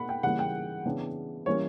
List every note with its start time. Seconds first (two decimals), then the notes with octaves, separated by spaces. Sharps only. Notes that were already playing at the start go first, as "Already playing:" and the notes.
Already playing: B2 A#3 F#5 B5
0.09 G5
0.23 C#3 E3 G3 A#3 F#5
0.39 G5
0.86 C#3 E3 B3 D4
1.46 E3 G3 A#3 C#4 C#5